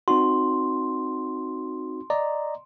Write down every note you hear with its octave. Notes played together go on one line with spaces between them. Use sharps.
C4 D#4 F#4 C6
D5 D#5 A#5